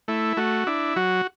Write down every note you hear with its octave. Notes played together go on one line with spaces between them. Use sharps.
A3 E4
A3 F#4
D4 E4
F#3 F#4